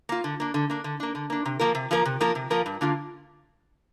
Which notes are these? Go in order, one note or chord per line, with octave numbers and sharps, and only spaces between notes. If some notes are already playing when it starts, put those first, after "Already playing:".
A#3 F4
D3
A#3 D4
D3
A#3 D4
D3
A#3 D4
D3
A#3 D4
C3
F3 A#3 F4 A#4
C3
F3 A#3 F4 A#4
C3
F3 A#3 F4 A#4
C3
F3 A#3 F4 A#4
G2
D3 A#3 D4 F4